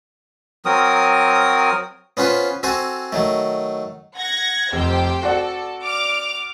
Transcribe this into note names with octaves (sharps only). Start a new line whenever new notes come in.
F#3 C4 A#4 D#6
B3 C#4 F4 B4 C5
C4 F#4 A4 C5 G#5
D#3 F#3 A3
F#5 G#6 A#6
F1 G4 C5 G5
F#4 A4 D5 F#5
D6 F6